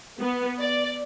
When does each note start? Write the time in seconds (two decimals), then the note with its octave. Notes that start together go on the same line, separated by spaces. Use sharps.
0.20 B3
0.60 D5